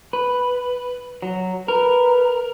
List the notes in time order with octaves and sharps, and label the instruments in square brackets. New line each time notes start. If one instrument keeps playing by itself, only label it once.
[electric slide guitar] B4
F#3
[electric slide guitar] A#4 [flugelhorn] B4